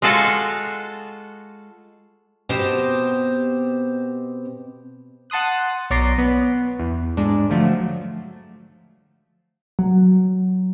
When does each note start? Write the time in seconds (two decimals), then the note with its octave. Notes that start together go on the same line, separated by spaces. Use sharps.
0.02 G#3 F4 F#4 A4
2.49 B2 C4 G4 C5 D#5 A5
5.30 F#5 A5 C6 D#6 F#6
5.90 B1 C#5 D5 A#5 C6
6.18 B3
6.79 E2
7.17 G#2 D4
7.50 D3 F3 F#3 A3
9.79 F#3